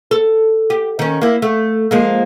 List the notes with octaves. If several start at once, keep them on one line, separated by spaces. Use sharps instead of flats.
A4
G4
D#3 C#4
A#3 E4
A3
F3 G#3 A#3